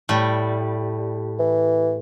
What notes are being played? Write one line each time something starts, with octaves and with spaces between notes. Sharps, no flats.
A2 G3
E3